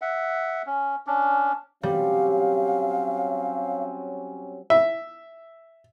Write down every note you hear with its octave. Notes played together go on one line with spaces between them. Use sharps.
E5 F#5
C#4
C#4 D4
F#3 G3 C4 C#4 F5
E5